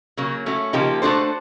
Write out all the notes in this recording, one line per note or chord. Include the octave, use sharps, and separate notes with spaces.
C#3 F#3 A#3
A3 C#4 F#4
C#3 F3 A#3 D#4 G4
A3 D4 F#4 A4 C5